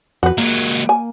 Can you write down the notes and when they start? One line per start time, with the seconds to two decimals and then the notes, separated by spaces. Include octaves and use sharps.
0.23 F2 F#4 B4
0.38 F#3 G#3 A#3
0.89 G#5